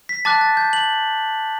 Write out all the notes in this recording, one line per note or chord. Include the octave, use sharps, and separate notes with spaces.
B6
A5 D6 F#6 A6
A6
G6
F#7